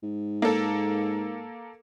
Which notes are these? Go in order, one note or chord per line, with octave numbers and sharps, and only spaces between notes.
G#2
A#3 A4